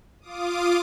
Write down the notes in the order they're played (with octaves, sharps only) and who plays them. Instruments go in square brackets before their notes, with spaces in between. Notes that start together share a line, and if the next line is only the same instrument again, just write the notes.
[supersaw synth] F4 F5 D6 D#6